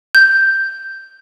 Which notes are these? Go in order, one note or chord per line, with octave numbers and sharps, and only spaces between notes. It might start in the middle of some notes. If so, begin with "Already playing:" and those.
G6